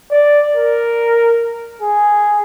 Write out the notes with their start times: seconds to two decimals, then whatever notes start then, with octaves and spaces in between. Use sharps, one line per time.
0.11 D5
0.56 A#4
1.81 G#4